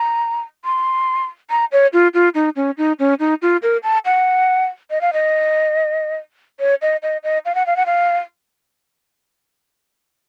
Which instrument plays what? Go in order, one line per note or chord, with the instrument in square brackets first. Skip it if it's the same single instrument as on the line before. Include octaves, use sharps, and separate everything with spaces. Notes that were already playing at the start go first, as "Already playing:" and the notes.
Already playing: [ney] A#5
C6
A#5
C#5
F4
F4
D#4
C#4
D#4
C#4
D#4
F4
A#4
A5
F#5
D#5
F5
D#5
C#5
D#5
D#5
D#5
F5
F#5
F5
F#5
F5